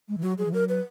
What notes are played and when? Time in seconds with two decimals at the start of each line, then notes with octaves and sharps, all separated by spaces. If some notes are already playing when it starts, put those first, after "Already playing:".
0.08 G#3
0.17 E3
0.23 F#3 F#4
0.38 F#3 G#4
0.45 E3
0.53 F#3 A#4
0.69 B4